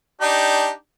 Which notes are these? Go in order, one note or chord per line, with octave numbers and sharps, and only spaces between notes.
D4 D#4 G4